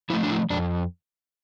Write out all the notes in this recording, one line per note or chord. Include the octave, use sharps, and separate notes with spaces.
F3 A3 E4
D4
E4
F2 D4